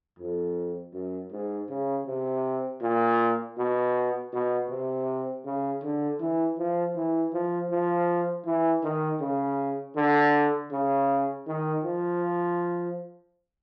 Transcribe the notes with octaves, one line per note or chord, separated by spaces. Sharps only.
F2
F#2
G#2
C#3
C3
A#2
B2
B2
C3
C#3
D3
E3
F3
E3
F3
F3
E3
D#3
C#3
D3
C#3
D#3
F3